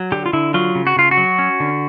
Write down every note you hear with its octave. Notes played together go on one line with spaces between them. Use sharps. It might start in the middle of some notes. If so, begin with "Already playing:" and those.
Already playing: F#3
D3 G4
F4
D3 E4
F#3 F4
C#3
F#4
C#3 F4
F#4
F#3
C#4
D3